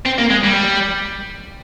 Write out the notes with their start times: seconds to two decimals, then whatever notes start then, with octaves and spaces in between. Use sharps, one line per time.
0.06 C4
0.19 A#3
0.30 G#3
0.44 G3